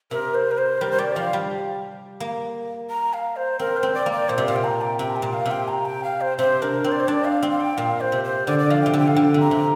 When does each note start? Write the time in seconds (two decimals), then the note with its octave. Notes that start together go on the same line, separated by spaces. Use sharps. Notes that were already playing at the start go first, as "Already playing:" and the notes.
0.11 C3 A#4
0.34 C5
0.51 A#4
0.58 C5
0.81 G3 A#4
0.91 C5
0.98 G3 D5
1.16 F3 F5
1.33 G3
2.20 A#3
2.90 A#5
3.13 F5
3.36 C5
3.59 C4 A#4
3.77 C5
3.83 C4
3.94 D5
4.06 A#3
4.12 D5
4.29 A#2 C5
4.38 C3
4.46 A#2 F5
4.56 G5
4.64 A#5
4.81 G5
4.99 C3 G5
5.10 A#5
5.16 G5
5.22 A#2
5.33 F5
5.46 C3
5.51 G5
5.68 A#5
5.85 G5
6.04 F5
6.21 C5
6.38 C3 C5
6.62 D4 A#4
6.84 C4 C5
6.92 D5
7.00 C5
7.08 D4 D5
7.25 F5
7.43 C4
7.51 F5
7.60 G5
7.77 A#2 F5
8.01 C5
8.12 C3
8.24 C5
8.47 D3 D5
8.59 D5
8.70 F3 F5
8.81 C3 G5
8.94 D3
8.99 G5
9.08 F5
9.16 D3 G5
9.34 C3
9.40 A#5
9.51 C3